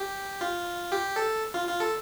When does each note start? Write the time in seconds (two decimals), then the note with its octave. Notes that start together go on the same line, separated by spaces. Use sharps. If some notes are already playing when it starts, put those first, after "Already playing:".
Already playing: G4
0.41 F4
0.92 G4
1.16 A4
1.54 F4
1.67 F4
1.80 A4